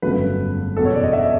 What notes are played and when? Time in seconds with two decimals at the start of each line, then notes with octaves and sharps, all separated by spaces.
0.02 G1 F2 C#3 F#3 A3 B4
0.76 F#1 E2 B2 A4
0.85 C#5
0.94 D5
1.04 D#5
1.13 E5